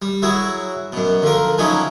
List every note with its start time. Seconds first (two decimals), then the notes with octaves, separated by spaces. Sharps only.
0.02 G3
0.22 F#3 E4 F#4 G#4
0.93 F#2 B2
1.22 D3 F3 A#4
1.58 F3 F#3 C#4 D#4 E4 G#4